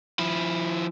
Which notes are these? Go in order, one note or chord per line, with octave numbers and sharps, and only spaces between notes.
F3 E4